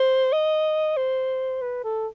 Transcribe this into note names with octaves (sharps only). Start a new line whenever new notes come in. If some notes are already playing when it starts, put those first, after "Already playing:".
Already playing: C5
D#5
C5
B4
A4